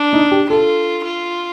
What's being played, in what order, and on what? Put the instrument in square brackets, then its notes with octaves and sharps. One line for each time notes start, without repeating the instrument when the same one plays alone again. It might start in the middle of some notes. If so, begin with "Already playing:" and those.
Already playing: [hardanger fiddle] D4
[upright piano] D#4
G4
[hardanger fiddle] F4 [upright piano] A4
[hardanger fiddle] F4